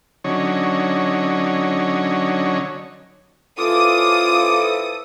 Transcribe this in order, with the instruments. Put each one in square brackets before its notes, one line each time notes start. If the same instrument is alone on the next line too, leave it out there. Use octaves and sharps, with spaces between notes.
[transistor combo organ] D3 F#3 C#4 D#4 C#5
[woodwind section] E3 F3 A4 [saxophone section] C#4 F4 [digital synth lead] D6 [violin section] D#6